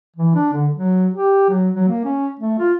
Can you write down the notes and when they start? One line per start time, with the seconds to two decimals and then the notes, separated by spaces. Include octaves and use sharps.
0.16 E3
0.35 D4
0.53 D3
0.75 F#3
1.14 G4
1.49 F#3
1.74 F#3
1.89 A#3
2.04 C#4
2.40 A3
2.59 F4